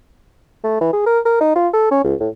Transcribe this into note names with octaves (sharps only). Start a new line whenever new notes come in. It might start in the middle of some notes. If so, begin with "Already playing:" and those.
A3
E3
G#4
A#4
A#4
D#4
F4
A4
C#4
C#2
A2